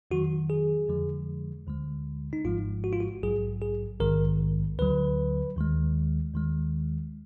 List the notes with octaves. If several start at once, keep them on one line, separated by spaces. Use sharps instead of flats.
F2 D#3 F#3 F#4
G#4
F2 D3 F3 G#3
D2 D3 G#3
D#4
G#1 G#2 F3 G#3 F4
F#4
F4
F#4
A#1 G#2 F#3 G#4
G#4
A#1 G#2 D#3 G#3 A#4
D2 D3 F#3 B4
D#2 D#3 G#3
D#2 D#3 G#3